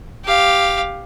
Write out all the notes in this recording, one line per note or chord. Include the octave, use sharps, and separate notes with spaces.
G4 F5